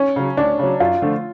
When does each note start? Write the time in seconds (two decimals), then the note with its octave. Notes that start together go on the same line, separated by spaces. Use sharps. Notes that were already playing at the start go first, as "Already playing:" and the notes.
Already playing: C#4
0.16 C#3 F#3
0.37 D2 D4
0.59 C#3 F#3
0.80 F#2 F4
1.02 D3 F3 A3